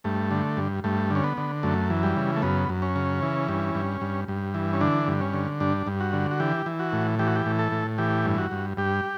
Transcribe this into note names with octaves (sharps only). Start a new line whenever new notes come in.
G2 A3
D3
G2
G2 A3
D3 C#4
B3
D3
F#2 A3
E3
G3
C#3
A3
F#2 B3
F#2
C#4
C#3
E3
G2
G2
G2
G2
E3
C#4
D3 D4
G2
C#4
D3
G2 D4
G2
F#4
D3
F#4
E3 G4
E3
F#4
A2
E3 G4
F#4
G4
A2
A4
A2
E3 G4
G2
F#4
G2
G2 G4